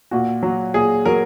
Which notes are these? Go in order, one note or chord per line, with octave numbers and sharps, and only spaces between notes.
A#2 F#4
F#3
A#2 G#4
F#3 A#4